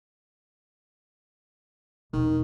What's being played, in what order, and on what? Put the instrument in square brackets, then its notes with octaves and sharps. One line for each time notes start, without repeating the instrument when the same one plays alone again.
[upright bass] E1 [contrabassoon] D#3